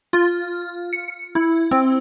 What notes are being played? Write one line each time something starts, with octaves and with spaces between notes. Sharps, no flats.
F4
C#7
E4
C4